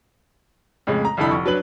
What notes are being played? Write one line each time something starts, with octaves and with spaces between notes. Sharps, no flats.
F2 A2 C#3 G#3
A#5
C2 F2 D3 E4 A4 B5
F1 C#6
F#3 D4 B4 F#7